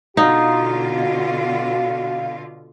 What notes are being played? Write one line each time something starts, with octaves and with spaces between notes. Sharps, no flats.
B2 D3 D#4 F4 F#4 F5